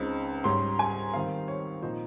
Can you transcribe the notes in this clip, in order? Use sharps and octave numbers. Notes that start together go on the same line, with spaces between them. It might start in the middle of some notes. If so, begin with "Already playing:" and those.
Already playing: C#2 C#3 G#3 C4 D#4
G#2 G3 C#4 C6
G#5
F2 D#3 G3 C4 F5
C#5
A#2 F3 C4 D#4 C5